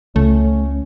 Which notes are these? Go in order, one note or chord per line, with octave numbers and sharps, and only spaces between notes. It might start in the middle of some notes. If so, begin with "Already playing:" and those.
C#2 A3 C#4